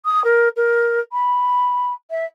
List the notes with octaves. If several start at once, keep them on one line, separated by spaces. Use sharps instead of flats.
D#6
A#4
A#4
B5
E5